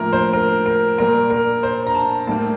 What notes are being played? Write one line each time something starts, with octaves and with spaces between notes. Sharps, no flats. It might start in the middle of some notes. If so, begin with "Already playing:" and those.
Already playing: A2 F3 A#3 A#4
C5
A#4
A#4
A#2 G3 A#3 A#4
A#4
C5
A#5
A5
A2 G3 A#3 A5